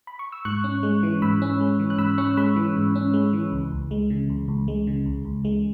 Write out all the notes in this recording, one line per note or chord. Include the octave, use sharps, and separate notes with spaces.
B5
C#6
E6
G#2 C#6 F#6
C#4
G#3
E3
G#2 B5 E6
C#4
G#3
E3
F#6
G#2 B5 E6
C#4 C#6 F#6
F#6
G#3 B5 E6
E3
G#2
C#4
G#3
E3
C#2
C#2
G#3
C#3
C#2
C#2
G#3
C#3
C#2
C#2
G#3